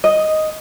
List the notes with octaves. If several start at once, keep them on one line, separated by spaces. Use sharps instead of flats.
D#5